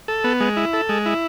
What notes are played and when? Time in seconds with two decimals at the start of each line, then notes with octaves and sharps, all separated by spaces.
0.08 A4
0.24 B3
0.40 G#3
0.56 E4
0.73 A4
0.89 G#3
1.06 E4